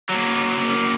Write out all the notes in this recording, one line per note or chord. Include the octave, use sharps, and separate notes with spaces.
F#3 A#3